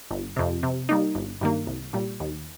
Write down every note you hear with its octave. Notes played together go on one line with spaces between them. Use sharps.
G1
F2 C3
C3
G3 A#3 D#4
G1
G2 D#3 A#3
C2
A#2 G3
D#2